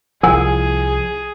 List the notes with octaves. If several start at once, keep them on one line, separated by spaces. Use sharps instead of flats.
C2 F3 E4 G#4 A#4 G#5